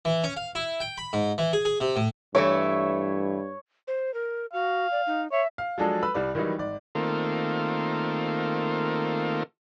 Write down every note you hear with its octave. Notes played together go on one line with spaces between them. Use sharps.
E3
C#4
F5
E4
G5
B5
G#2
E3
G#4
G#4
C3
A2
G2 E3 A3 E4 C#5
C5
A#4
F#4 F5
D5
D#4
C#5 E5
F5
F3 F#3 G#3 D4 G#4 A4
B4 B5 E6
C2 G3 D5
D#3 E3 F#3 G3 D#4
G#1 D5
D#3 A3 A#3 C4 F4